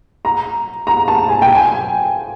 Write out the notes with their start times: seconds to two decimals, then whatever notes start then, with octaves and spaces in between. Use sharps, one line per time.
0.25 A#5
0.87 A#5
1.08 A5
1.28 G#5
1.42 G5
1.55 G#5